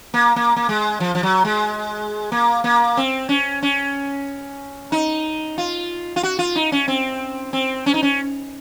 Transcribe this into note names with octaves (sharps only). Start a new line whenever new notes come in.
A#3
A#3
A#3
G#3
F3
F3
F#3
G#3
A#3
A#3
C4
C#4
C#4
D#4
F4
F4
F#4
F4
D#4
C#4
C4
C4
C#4
D#4
C#4